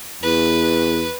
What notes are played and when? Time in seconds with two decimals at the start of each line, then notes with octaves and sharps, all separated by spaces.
0.23 E2 B4